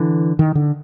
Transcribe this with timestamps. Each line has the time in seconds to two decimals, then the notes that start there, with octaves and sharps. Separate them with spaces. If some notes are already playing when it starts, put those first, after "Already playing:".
Already playing: D3 E3
0.39 D#3
0.55 D3